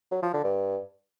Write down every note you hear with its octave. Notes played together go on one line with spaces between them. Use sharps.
F#3
F3
D3
G2